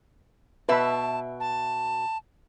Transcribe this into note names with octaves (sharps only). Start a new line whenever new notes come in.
B2 B4 E5 A5 B5
A5